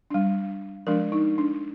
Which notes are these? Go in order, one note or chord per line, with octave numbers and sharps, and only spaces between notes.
G3 D4
F3 G#3 D4 A#4
D#4
D4